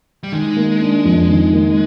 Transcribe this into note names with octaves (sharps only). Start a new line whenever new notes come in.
G3
D#3 G#3
A#3
D4
F2
D#3
A#3